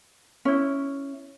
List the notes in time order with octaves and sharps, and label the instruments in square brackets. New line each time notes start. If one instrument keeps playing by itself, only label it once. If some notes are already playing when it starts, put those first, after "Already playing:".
[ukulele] C#4 E4